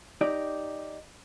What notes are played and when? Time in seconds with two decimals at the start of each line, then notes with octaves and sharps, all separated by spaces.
0.21 D#4 G4 D5